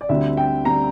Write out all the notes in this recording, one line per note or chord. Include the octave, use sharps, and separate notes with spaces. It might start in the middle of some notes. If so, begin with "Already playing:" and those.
D5
D2 D3 G3 C4 E5
G5
D3 G3 C4 A#5